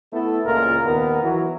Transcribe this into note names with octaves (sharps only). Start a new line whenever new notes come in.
A3 B3 E4 A4
C#2 A#2 F4 A#4
D#2 B3 A#4
E3 F#3